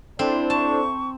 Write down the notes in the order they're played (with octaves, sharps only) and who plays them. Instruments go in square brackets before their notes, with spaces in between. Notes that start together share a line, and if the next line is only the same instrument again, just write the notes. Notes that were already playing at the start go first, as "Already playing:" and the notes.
[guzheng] C4 [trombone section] D4 [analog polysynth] E4 A4 C5
[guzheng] A5 [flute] C#6